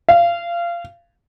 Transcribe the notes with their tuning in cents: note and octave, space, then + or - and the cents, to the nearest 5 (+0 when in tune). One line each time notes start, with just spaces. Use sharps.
F5 -25